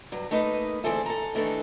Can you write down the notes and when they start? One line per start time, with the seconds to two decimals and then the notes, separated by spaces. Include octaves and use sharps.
0.12 G2 F#3
0.31 A3 A#3 D#4 B4 D#5
0.84 D2 E3 C4 G#4 A4 E5
1.06 A4 A#5
1.35 D#3 E3 A3 D4 D#4 A4